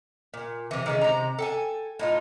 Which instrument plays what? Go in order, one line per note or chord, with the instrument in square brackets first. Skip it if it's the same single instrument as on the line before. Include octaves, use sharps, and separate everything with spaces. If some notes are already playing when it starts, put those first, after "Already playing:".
[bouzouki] A#2
C3 E3
D#3 G#3 C#4
C3 A#5
A4 G5 G#5
A2 D#4 F4